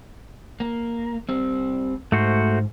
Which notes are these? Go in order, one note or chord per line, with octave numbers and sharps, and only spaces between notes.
A#3
G3 C4
G#2 A3 F#4 C5